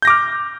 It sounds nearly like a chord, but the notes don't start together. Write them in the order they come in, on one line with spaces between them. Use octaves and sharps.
G6 A#6 D6 F6